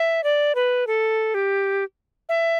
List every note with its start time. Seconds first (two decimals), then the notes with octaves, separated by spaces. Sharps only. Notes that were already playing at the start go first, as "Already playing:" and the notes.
Already playing: E5
0.24 D5
0.55 B4
0.87 A4
1.34 G4
2.29 E5